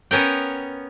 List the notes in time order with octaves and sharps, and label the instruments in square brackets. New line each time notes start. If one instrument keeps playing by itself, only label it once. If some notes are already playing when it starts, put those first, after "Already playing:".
[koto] B3 C#4 A#4 G5